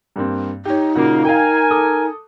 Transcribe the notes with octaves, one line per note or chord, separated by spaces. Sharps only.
G2 A#3 C4
D#4 G4 C#5
A#2 C#3 A#3 F#4
A#4 F5 G5 G#5
A4 D6 D#6